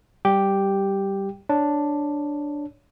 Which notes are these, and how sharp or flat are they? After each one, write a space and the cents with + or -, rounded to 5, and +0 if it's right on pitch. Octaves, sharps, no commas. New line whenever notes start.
G3 -5 G4 +0 G5 +0
D4 +0 C#5 +0